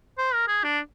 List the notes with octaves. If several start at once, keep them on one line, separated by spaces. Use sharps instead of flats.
C5
A#4
G#4
D4